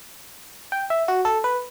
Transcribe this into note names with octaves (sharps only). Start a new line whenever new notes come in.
G5
E5
F#4
A4
B4